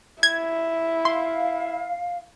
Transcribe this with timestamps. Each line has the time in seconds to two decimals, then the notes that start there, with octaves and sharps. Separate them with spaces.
0.23 E4 G#6
1.05 F5 C6